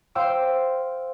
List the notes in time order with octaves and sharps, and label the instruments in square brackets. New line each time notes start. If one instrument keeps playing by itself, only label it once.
[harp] C5 F5 G5 C6 D6 E6